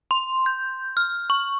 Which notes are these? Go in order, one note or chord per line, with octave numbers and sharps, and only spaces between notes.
C6
G6
F6
C#6